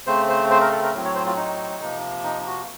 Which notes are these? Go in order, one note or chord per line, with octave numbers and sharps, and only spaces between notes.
C#3 A3 C4 C5
C5
C5
A#4
A4
A#4
A2 F#3 C4
C#5
C5
F4
D#4
C3 F3 A#3
D#4
F#4